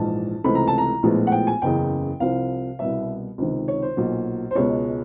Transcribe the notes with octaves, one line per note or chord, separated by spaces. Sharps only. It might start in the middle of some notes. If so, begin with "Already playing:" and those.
Already playing: A#1 G#2 E3 A5
C#2 C3 E3 A3 B5
A#5
A5
A#5
A#1 A2 F3 G#3 B3
F#5
G5
G#5
F#1 E2 C#3 G5
C2 C3 F3 F5
C2 B2 G3 B3 E5
C#2 C3 D#3
C#5
C5
B1 A#2 F#3
C5
C#2 B2 G#3 B3 C#5